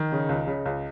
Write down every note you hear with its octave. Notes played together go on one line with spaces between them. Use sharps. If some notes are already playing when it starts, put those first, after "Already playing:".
Already playing: D#3 D#4
C#3
C#2
C#3
C#2